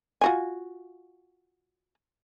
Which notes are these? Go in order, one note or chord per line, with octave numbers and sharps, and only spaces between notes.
F4 F#4 G#5